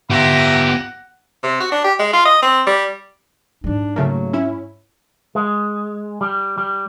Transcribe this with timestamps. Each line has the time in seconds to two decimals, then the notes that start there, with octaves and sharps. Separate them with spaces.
0.10 B3 F4 G4 E5 F#5 A#5 A#6
1.43 C3
1.60 F#4
1.72 D4
1.84 G4
1.99 G#3
2.13 F4
2.25 D#5
2.42 C4
2.67 G3
3.64 G#2 G3 D4
3.96 C#3 F#3 A3 A#3
4.33 C#4 E4
5.35 G#3
6.21 G3
6.58 G3